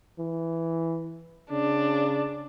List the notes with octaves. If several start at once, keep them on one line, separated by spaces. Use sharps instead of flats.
E3
C#3 D4